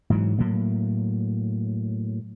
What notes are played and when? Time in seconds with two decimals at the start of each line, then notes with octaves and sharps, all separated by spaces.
0.10 G#2 E3 F#3
0.39 A2 F#3 A#3